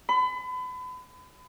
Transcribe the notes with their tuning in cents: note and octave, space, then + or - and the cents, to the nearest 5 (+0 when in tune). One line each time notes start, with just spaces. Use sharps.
B5 +35